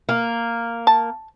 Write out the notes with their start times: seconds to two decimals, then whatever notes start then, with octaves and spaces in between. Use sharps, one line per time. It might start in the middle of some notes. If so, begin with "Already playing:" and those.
0.09 A#3
0.87 A5